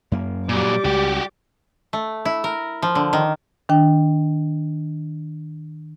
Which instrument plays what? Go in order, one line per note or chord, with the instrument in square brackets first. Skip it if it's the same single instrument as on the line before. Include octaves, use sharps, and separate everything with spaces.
[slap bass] F#2 A#3
[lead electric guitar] A#2 F#3 [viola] G3 D6
[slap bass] C#2 [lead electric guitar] F#4 G4
[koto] A3
E4
A#4
F3
D3
D#3
[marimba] D#3 D4 G5